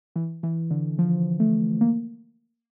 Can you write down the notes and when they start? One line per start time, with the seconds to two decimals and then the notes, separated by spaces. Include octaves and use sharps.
0.16 E3
0.43 E3
0.71 D3
0.98 F3
1.40 A3
1.81 A#3